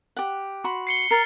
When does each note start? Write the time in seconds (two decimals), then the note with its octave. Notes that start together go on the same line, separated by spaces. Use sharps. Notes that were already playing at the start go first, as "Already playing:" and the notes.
0.16 G4 F#5
0.64 F#4 B5 C6
0.87 C7 C#7 G7
1.11 A#4 F6 A6 C7